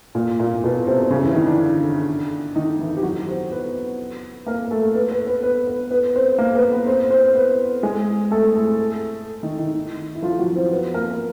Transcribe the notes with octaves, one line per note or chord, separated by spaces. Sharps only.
A#2 A#3
A#2 A#3
B2 B3
C3 C4
C4
C#3 C#4
E3 E4
D#3 D#4
D3 D4
D#3 D#4
E3 E4
G4
F#3 F#4
C4 C5
B3 B4
A#3 A#4
A3 A4
B3 B4
B3 B4
B3 B4
B3 B4
B3 B4
B3 B4
C4 C5
A#3 A#4
B3 B4
B3 B4
C4 C5
C4 C5
B3 B4
G#3 G#4
A3 A4
A3 A4
D#3 D#4
D#3 D#4
E4
F3 F4
F#3 F#4
C4 C5
B3 B4
A#3 A#4